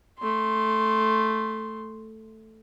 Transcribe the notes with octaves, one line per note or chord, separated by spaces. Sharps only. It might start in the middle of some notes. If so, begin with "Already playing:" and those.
A3 C6